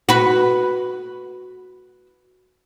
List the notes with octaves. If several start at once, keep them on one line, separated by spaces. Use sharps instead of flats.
F#4 B4